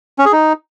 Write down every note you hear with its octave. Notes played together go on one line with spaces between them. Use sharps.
C#4
G#4
D#4